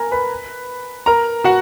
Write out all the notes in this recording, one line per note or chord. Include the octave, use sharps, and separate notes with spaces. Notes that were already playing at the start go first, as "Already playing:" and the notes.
Already playing: A#4 G#5 A#5
B4 B5
A#4 A#5
F#4 F#5